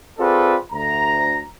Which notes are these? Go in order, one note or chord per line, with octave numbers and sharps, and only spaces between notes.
C4 F4 G#4 A4 B4 D5
D2 A#5